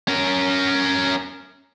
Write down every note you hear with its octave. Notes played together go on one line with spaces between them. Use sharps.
C#4 A#4